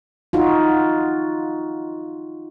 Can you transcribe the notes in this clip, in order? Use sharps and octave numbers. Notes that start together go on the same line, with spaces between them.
D#4 F4 F#4